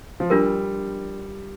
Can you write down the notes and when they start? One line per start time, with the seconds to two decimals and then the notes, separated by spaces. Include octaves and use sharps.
0.20 F3
0.30 G3 D4 F4 A#4